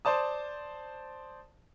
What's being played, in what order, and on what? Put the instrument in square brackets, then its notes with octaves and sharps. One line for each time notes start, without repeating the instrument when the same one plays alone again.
[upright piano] C5 D5 A5 D#6